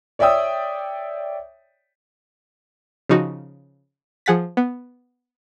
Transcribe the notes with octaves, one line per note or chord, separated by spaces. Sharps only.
C#5 D5 E5 G5 D#6 E6
C#3 F3 D#4 F#4
F3 G#4 F#5 A6 B6
B3